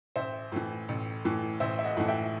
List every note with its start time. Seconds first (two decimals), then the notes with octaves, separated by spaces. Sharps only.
0.16 A1 C5 E5
0.52 A2 E3
0.89 A1
1.25 A2 E3
1.60 A1 C5 E5
1.79 E5
1.84 D#5 F#5
1.97 A2 E3 F#5
2.08 E5 G5